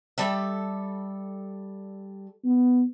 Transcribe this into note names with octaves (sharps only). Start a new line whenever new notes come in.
G3 A4 E5
B3